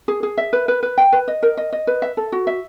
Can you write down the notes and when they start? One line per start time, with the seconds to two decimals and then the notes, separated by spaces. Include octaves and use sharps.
0.08 G#4
0.23 G#4
0.38 E5
0.53 B4
0.68 B4
0.83 B4
0.98 G5
1.12 B4
1.28 D#5
1.43 A#4
1.57 D#5
1.73 D#5
1.87 B4
2.02 E5
2.17 A4
2.32 F#4
2.47 E5